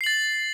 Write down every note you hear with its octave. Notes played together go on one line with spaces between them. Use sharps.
A6 C7 F#7